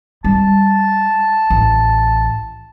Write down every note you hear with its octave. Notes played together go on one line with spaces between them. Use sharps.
G3 A5
A1